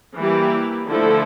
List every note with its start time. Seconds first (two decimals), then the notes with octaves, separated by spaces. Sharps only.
0.17 E3 G3 A#3 E4 G4
0.89 D3 F3 A3 E4 A4